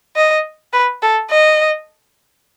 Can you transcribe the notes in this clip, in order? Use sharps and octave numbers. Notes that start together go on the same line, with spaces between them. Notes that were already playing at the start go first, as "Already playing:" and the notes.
D#5
B4
A4
D#5